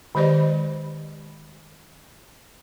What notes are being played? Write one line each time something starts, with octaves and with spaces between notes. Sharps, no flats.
D#3 G#3 G4 C5 D5 D#5